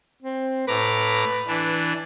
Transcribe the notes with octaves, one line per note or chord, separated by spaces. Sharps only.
C4
A2 B4 A#5 D6
E3 D4